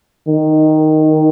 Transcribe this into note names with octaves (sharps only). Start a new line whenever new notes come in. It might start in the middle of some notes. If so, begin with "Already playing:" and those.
D#3